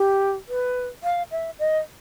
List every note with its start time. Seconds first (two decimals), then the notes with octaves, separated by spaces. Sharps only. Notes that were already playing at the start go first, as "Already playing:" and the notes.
Already playing: G4
0.48 B4
1.03 F5
1.31 E5
1.59 D#5